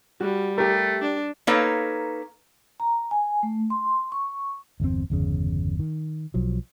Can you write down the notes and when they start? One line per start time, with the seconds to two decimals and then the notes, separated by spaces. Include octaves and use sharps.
0.21 G3 F#4
0.58 A3 G4 A#4
1.01 D4
1.47 A#3 D#4 A4 B4 C#5 F5
2.80 A#5
3.11 G#5
3.43 A3
3.70 C6
4.12 C#6
4.80 G1 E2 C3 C4
5.10 G1 E2 C#3
5.79 D#3
6.34 B1 F3 F#3